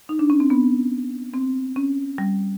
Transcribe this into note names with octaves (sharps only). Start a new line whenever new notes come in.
D#4
D4
C#4
C4
B3
C4
C#4
G3